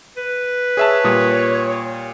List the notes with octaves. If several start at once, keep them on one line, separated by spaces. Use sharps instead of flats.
B4
G#4 C#5 E5 A5
A#2 G3 D#6